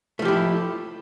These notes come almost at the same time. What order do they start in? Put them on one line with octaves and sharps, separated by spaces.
A3 F3 G4 E4